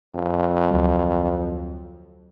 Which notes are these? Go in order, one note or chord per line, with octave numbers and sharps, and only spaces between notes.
F2
D2 F#3